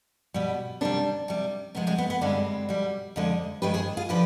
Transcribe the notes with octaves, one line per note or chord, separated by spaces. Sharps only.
B2 G3
C3 D#3 G3 B3 D4
C3 G3
C3 F3 G#3 B3
G#3 C4
B3
B3
G2 D3 G3 G#3 C4
B2 G3
F2 D3 G#3
G2 D#3 G#3 G4 B4
G#4 C5
F4 G#4
D3 F3 G4 B4